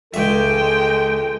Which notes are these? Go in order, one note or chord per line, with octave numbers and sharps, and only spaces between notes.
C#2 G#3 A4 E5 G5